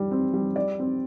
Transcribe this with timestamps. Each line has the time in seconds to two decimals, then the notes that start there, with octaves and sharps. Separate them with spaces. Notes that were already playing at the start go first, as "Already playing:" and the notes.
Already playing: G3
0.11 C4
0.34 G3
0.56 D5
0.79 C4